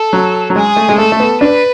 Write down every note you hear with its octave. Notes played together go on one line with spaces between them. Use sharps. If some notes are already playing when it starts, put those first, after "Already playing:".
Already playing: A4
F#3
F#3
G#3 G#4
A3
G#3
A3 A4
A3
B3
D4 B4